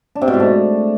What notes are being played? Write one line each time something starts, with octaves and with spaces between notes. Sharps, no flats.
D4
C3
B2
G#2
A3